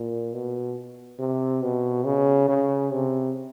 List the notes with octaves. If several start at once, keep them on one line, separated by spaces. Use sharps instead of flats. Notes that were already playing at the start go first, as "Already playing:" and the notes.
Already playing: A#2
B2
C3
B2
C#3
C#3
C3